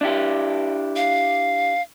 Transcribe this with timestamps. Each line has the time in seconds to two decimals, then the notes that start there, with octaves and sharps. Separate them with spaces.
0.01 D4 E4 G4
0.96 F5